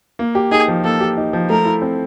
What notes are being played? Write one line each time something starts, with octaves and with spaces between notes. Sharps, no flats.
A#3
G4
D#4 G#4
F3
A#3 A4
G4
D#4
F3
A3 A#4
E4
C4